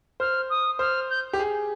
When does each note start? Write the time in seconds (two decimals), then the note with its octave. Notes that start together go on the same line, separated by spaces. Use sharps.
0.20 C5 F6
0.50 D#6
0.79 C5 F6
1.09 G6
1.33 G4
1.39 G#4